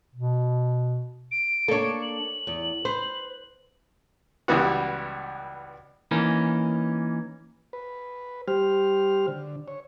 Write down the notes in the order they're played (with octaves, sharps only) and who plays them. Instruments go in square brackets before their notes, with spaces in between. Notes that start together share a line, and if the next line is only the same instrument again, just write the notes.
[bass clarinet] B2
[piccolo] D7
[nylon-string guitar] A#3 D4 [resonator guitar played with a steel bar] A4 C#5
[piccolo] F#7
[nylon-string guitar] E2
[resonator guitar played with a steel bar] B4 [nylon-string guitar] C5
[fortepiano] C#2 E3 G3 B3 F#4
[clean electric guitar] E3 A#3 C#4 D#4
[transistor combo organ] B4
G3 G4 C5 F6
D3
C#5